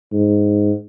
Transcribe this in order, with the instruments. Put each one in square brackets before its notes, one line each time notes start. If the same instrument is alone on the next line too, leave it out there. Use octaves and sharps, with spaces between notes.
[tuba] G#2